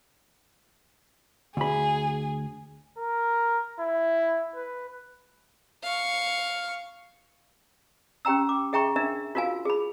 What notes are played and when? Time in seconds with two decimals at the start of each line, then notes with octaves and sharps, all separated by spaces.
1.57 D2 G#4 B5
2.98 A#4
3.80 E4
4.55 B4
5.83 F5 C#6
8.25 C#4 G4 G5 A#5 E6
8.49 D6
8.73 G#4 E5 G5 A#5 C#6
8.96 D4 A#4 E5
9.35 F4 F#4 A#4 F5 G#5
9.65 G#4 B5